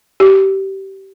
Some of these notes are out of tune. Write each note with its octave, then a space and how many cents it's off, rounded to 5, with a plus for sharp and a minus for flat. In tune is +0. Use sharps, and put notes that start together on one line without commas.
G4 -25